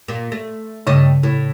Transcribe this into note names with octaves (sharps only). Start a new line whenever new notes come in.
A#2 A#3
A3
G2 C#3 A3 C#5 D#5 C#6
A2